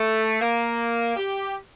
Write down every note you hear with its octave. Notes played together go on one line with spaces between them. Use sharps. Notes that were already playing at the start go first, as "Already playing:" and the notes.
Already playing: A3
A#3
G4